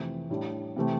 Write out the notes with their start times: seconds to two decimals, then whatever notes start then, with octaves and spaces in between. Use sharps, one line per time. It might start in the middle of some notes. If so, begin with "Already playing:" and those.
Already playing: F2 C3 E3 A3 C4
0.30 A2 G3 D4
0.76 C3 E3 A3 C4